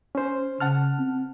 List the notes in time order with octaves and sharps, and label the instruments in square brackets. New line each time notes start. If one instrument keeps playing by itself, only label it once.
[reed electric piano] C#4 C5
[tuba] C#3 [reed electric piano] F#5 A5 F6
[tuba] C4